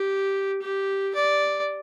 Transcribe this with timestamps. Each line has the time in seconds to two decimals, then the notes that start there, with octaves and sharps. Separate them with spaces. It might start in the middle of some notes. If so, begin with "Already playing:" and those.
Already playing: G4
0.62 G4
1.14 D5